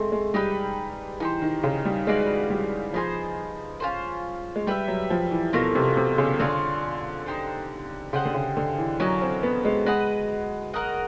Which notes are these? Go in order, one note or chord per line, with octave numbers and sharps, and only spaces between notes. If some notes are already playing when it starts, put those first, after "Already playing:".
Already playing: G#3 A3 C4
G#3
G3 D#4 G4 B4
E3 D#4 G4 C5
D#3
C#3
G3
G#3 F#4 B4 D5 F5
G3
F3 B3 D#4 G#4 C5
C#4 F4 A4 C5
G#3
G3 G4 B4 E5
F#3
F3
E3
B2 A3 C4 F4 A#4
C3
C3
C#3
D3 C4 F4 G#4 C#5
D#4 G4 C5
C#3 G4 C5 D#5 F#5
D3
C#3
D3
E3
F#3 C#4 F#4 A#4 D#5
C4
B3
G#3
G#3 F#4 B4 D#5 F#5
F#4 A#4 D#5 F#5